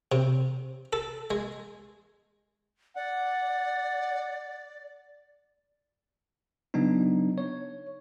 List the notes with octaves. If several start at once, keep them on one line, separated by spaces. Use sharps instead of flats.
C3
A4
G#3
D5 F#5
C#3 F#3 B3 D4 D#4
C#5